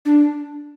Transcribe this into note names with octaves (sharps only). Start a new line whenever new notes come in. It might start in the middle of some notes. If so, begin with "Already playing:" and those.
D4